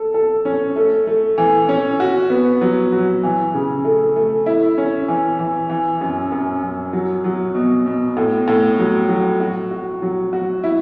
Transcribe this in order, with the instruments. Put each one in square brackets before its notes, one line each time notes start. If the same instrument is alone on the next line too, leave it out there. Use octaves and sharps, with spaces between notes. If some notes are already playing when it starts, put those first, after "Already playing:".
Already playing: [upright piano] A4
A4
C#4
A3
A3
E3
C#4
F#4
B3
F#3
F#3
E3
C#3
A3
A3
E4
C#4
E3
E3
E3
F#2
F#2
F#2
F#3
F#3
B2
B2
A2
A2
F#3
F#3
F#4
F#4
F#3
F#4
E4